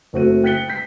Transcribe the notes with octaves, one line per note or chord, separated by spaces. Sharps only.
F#1 A3 C4 F#4 A4 D#7
G5 F#6 A6 B6 C#7 G7
G6 B6 C7